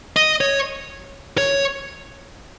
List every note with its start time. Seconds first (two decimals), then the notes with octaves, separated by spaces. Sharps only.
0.16 D#5
0.41 C#5
1.38 C#5